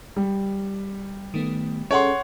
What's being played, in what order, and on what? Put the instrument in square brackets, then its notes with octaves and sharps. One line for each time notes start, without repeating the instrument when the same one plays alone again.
[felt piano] G3
[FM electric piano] D#3 A3 B3
[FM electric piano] C#4 G#4 A4 [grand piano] C#5 F#5 C6